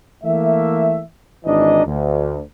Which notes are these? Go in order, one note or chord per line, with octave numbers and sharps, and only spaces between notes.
E3 A3 A#3 E5
G#1 E3 D4 D#4 D#5
D2